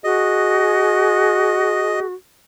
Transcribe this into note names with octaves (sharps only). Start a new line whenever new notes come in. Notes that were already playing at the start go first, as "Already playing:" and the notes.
F#4 G#4 D#5